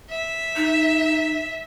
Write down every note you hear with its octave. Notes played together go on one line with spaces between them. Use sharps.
E5
D#4